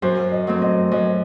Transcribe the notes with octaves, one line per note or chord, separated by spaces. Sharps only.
F#2 C5
D#5
F#3 A3 C4
D#5
F#2 D#5